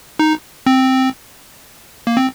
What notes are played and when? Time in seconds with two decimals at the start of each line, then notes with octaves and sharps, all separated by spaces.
0.19 D#4
0.66 C4
2.07 A#3
2.17 C4